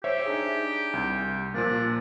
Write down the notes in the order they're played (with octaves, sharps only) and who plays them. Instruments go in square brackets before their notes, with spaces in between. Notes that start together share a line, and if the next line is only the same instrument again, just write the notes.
[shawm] G4 [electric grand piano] C5 C#5 E5
[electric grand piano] D4 D#4 G#4
C2
[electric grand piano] A#2 F3 A#3 [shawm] D4